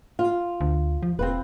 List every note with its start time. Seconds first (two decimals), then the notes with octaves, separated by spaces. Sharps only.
0.19 F4
0.61 D2
1.03 F3
1.19 E1 C4 F4 B4